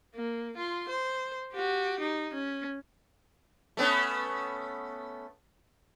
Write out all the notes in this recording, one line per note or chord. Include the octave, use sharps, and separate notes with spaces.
A#3
F4 C6
C5
F#4 G4
D#4
C#4
A3 B3 C#4